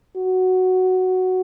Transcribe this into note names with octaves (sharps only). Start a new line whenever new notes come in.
F#4